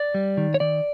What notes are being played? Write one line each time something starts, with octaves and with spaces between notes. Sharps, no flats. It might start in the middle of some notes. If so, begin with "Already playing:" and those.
Already playing: D5
G3
D#3
C#5
D#3 D5